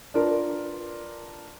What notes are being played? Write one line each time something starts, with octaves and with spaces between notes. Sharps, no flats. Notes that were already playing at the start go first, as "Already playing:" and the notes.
D4 F4 A#4 B4 D5